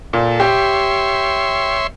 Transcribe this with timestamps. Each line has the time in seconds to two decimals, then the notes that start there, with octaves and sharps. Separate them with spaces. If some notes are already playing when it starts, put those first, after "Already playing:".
0.13 A#2 A4
0.40 G4 C#5 E5 C6